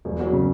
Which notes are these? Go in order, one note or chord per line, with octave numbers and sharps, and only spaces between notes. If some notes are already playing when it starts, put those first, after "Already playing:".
E1
F#3
C#3